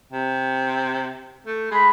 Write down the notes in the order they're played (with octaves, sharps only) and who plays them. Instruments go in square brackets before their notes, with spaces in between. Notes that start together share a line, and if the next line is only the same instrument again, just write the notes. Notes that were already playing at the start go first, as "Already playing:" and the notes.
[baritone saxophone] C3
A3
[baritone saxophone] G#3 [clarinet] B5